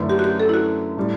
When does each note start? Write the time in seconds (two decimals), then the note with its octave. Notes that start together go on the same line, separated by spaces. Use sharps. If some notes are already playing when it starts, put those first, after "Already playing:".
Already playing: F#2 D3 A3 E4 B4
0.09 G4
0.19 F#4
0.24 G4
0.40 A4
0.49 E4
0.54 F#4
0.97 A2 G3